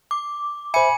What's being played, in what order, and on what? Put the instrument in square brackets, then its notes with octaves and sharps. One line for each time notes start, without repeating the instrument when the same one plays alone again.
[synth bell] D6
[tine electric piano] C5 E5 [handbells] G#5 C#7 [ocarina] B5